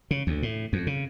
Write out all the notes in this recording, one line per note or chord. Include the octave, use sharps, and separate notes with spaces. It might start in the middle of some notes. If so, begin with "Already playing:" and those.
C#3
D2
A2
F2
C#3